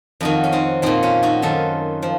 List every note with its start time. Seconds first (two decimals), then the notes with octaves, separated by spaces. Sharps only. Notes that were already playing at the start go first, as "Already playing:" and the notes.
0.21 F2 D#3 D#4 F#4
0.44 C#4
0.52 C4 D#4
0.82 A#2 F3 C4 D#4
1.03 C#4 F4
1.23 D#4 F#4
1.42 F#2 D#3 F4 A4
2.03 F3